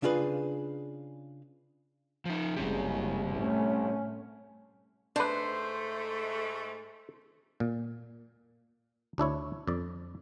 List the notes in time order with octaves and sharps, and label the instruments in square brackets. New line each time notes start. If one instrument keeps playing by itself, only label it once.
[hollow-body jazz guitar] C#3 D4 F4 G#4 B4
[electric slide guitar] F3 D#4
[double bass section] F#1 C#3 G#3 [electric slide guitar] G3 C4 G4
[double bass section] A2 A3 C#4
[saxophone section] G#2 G#3 A3 [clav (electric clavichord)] D4 B4 [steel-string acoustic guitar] C5
[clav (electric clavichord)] A#2
D2 D4 E4 C#5
F2 D5